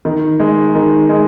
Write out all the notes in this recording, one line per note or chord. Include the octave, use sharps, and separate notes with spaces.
D#3
G#3 D#4
D#3
G#3 D#4